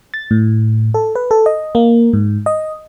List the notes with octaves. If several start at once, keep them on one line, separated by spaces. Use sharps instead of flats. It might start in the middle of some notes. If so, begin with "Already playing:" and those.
A6
A2
A4
B4
A4
D#5
A#3
G#2
D#5